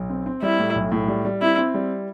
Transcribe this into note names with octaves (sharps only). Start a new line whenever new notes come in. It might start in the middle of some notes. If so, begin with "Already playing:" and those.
Already playing: B1
C4
C4
G3 E4
A2
B1
A2
G3
G3
C4 E4
C4
G3